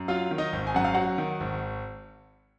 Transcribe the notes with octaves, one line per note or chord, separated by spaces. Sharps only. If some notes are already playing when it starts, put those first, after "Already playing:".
Already playing: F#2
F#3 F4 F5
D#3
D#4 D#5
G#1
G#5
F#2 F#5
F5
F#3 F#4 F#5
D#3
G#1